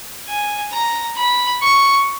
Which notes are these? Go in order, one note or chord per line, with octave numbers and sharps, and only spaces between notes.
G#5
A#5
B5
C#6